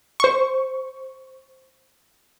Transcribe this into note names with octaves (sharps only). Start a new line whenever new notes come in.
C5 C#6